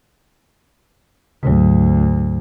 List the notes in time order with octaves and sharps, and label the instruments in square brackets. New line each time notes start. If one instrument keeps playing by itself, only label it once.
[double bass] D2 [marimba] G#2 F#3